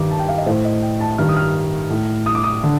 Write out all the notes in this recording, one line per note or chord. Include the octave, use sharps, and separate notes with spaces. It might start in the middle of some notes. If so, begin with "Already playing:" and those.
Already playing: G2 D#3 D6
A5
G5
F5
D#5
A2 C5
D#5
G5
A5
G2 D#3 F6
D#6
F6
A2
D#6
D6
D#6
D3